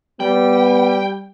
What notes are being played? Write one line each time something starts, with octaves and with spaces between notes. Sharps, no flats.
G3 B3 G5